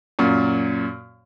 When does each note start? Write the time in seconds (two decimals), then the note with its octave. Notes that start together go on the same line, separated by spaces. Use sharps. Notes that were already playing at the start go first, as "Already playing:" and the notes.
0.19 F#2 A#2